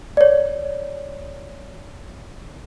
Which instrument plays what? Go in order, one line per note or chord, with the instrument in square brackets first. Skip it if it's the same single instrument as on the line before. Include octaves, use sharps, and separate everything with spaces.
[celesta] C#5 D5